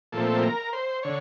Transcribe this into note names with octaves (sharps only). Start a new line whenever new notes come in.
A#2 F3 A3 C4 A4
A#4
C5
D3 C#5